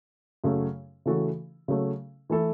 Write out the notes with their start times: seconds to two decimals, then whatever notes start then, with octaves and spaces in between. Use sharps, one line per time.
0.44 F#2 C#3 F#3 A3
1.06 C#3 E3 A3 F#4 A4
1.68 C#3 F#3 A3
2.30 E3 A3 E4 A4